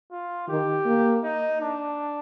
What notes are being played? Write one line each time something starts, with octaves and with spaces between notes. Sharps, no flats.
F4
D#3 G4
A#3
D#4
D4